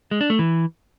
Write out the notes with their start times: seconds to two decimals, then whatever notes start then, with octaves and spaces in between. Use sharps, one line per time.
0.11 G#3
0.21 D4
0.30 A3
0.39 E3